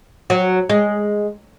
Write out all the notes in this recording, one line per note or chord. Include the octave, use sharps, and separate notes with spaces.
F#3
G#3